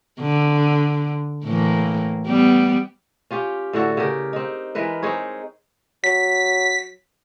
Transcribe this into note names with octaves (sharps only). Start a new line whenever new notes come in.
D3
A2 E3 A#3
G3 B3
C#4 F4 G4
A2 D3 F#4 A4
C#3 G4 A#4
C4 D#4
E3 G#3 A#4 B4
C4 D#4 G#4 C#5
F#3 B6